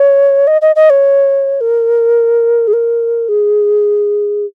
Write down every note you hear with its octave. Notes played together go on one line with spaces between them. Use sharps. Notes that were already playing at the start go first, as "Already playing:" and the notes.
Already playing: C#5
D#5
D#5
D#5
C#5
A#4
G#4
A#4
G#4